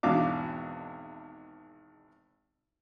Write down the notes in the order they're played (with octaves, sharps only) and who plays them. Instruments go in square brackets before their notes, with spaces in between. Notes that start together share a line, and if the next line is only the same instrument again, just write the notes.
[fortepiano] G#1 E2 B2 D4 F5 D6